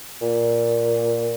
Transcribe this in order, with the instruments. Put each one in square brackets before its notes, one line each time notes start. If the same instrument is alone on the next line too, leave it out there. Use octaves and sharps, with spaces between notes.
[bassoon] A#2